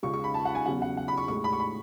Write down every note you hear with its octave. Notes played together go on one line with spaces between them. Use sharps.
C#2 C#3 G#3 C#6
C#6
B5
A5
F#5
G#5
E2 C#3 F#3 F#5
F#5
F#5
B5
C#6
A2 G#3 C#6
B5
C#6
B5